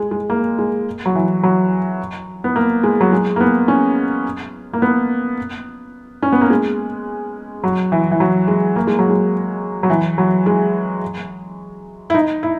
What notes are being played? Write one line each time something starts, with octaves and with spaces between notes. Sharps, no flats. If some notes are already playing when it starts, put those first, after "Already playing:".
Already playing: G#3
G#3
A#3
G#3
F#3
E3
F#3
B3
A#3
G#3
F#3
G#3
A#3
B3
C#4
A#3
B3
C#4
B3
A#3
G#3
F#3
E3
E3
F#3
G#3
A#3
G#3
F#3
G#3
F#3
E3
F#3
G#3
E4
D#4
E4